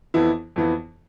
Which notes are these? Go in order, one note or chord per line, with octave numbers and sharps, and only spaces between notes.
F2 E3 B3 E4
F2 E3 B3 E4